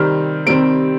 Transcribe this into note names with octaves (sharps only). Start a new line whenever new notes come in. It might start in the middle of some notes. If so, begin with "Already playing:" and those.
Already playing: C3 D#3 G3 C4 F6
C3 D#3 G3 C4 D7